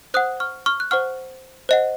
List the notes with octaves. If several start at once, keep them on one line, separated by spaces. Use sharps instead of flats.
C5 F#5 D#6 F#6
C#6 F6
C#6 F6
F#6
C5 F#5 C#6 F6
C5 D#5 F#5